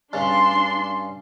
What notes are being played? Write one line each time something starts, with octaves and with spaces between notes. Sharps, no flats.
G2 C#3 D4 C6